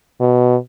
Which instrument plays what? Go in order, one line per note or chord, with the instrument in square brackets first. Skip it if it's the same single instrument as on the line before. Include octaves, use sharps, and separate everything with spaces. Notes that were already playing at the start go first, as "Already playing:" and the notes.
[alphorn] B2